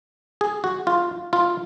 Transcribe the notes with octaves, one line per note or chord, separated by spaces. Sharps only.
G#4
F#4
F4
F4